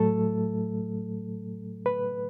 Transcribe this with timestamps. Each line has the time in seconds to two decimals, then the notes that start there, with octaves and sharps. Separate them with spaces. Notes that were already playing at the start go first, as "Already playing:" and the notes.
Already playing: A2 F#3 A3 A4
1.86 B4